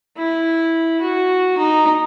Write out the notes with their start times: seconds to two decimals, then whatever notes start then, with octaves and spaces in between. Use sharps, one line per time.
0.17 E4
1.01 F#4
1.58 D#4